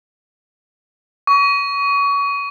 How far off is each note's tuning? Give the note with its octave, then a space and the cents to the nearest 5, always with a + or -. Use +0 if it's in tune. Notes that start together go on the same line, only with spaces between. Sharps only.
C#6 +30